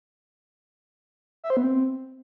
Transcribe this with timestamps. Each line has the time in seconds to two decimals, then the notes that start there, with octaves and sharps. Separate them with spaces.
1.44 E5
1.50 C5
1.57 B3
1.63 C4